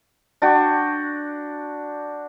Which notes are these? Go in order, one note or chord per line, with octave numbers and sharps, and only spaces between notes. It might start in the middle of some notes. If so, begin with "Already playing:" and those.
D4 F#4 G5 C#6